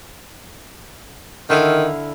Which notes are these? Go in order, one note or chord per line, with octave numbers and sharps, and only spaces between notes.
D3 D#3 E4 F5